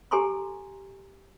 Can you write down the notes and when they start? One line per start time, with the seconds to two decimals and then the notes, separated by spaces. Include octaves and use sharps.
0.11 G4 A4 G#5 A#5 C6 C#6